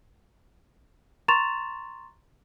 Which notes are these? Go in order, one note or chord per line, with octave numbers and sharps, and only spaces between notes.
A#5 C6 C#6 A6 E7 F7